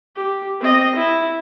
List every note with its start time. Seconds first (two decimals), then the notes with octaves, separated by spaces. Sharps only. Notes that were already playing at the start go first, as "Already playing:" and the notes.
0.16 G4
0.60 C4 D#5
0.95 E4